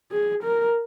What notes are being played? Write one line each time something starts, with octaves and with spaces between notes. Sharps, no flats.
G#4
A#4